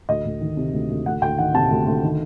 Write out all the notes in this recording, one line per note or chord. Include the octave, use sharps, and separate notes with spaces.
D2 D#5
D2
D#3
C3
D2
D2
D2 F#5
D2 G5
D#3 F#5
C3 A5
D2
D2
D#3